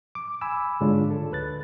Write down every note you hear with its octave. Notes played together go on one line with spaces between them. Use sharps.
D6
G#5 B5 D6 E6
G#2 D3 G#3 D4 F4 C#5
A4
D2 B4 F#6 A6